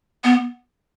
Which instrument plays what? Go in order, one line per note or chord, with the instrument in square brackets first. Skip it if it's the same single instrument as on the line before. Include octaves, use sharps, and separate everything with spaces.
[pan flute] B3